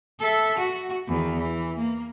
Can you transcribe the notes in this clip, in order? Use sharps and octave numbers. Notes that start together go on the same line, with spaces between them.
A4 E5
F#4
E2 D#3
E3
A#3